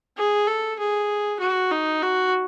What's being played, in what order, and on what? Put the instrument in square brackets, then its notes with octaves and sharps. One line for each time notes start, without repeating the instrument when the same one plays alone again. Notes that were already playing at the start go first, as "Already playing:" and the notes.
[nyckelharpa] G#4
A4
G#4
F#4
D#4
F#4